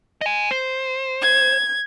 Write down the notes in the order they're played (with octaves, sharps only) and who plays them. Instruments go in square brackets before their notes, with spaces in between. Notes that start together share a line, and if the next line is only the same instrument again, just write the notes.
[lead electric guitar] D#5 G#5
C5
[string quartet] G#6